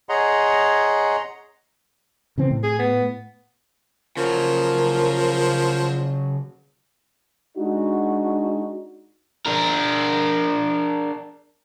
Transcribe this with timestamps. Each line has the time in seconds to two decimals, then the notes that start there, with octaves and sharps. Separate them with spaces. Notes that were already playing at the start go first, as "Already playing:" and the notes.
0.09 G#4 C#5 D#5 F#5 A#5 C6
2.38 C#3 E3 C4
2.51 A2
2.63 G#4
2.79 B3
4.17 C#3 F3 F#3 A#4
7.57 G#3 D4 D#4 F#4
9.46 D4 A#4